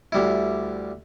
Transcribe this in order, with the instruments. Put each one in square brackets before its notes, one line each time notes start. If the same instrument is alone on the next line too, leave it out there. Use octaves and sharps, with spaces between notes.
[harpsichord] D2 G3 E4